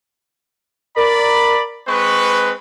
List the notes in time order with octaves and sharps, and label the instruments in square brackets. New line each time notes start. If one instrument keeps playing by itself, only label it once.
[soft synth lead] A#4 [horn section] D5 B5
[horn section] G#3 C4 B4 [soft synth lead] C#6